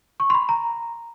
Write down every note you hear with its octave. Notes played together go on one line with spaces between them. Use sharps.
C#6
C6
B5
A#5